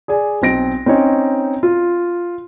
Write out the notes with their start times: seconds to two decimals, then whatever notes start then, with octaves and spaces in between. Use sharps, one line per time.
0.08 G#4 D5 G#5
0.42 B1 C4 A#6 D7
0.86 C4 C#4 D#4 C#5
1.63 F4